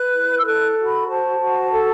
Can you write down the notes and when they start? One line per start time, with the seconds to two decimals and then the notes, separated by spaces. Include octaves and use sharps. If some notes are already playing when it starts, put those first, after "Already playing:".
Already playing: B4 F#6
0.14 E4
0.38 E6
0.45 A4 F#6
0.77 F#4
0.87 B5
1.08 C5 A5
1.39 F#4
1.70 A4